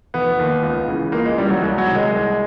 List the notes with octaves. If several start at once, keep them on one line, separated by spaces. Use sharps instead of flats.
F1 B3
D#2 D#3
C#2
C#3 E3
C#2 A#3
G#3
C#3 E3 G3
F#3
C2 F#3
F#3
C3 D#3
G#3
C2